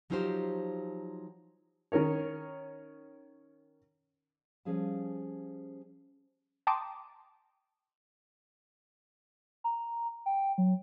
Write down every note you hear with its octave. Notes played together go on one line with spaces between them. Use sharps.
F3 F#3 D#4 F4 G4 C5
D#3 C#4 A#4 C#5
F3 G3 C#4 G#4 F5 A5
G5 A5 A#5 C6 D6 D#6
A#5
G5
F#3